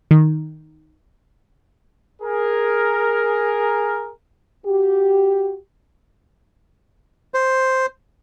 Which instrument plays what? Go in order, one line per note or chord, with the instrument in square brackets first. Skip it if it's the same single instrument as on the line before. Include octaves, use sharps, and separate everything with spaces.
[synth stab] D#3
[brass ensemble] G#4 A#4
[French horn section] F#4 G4
[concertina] C5